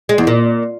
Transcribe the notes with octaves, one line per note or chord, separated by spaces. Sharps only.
G#3
E2
A#2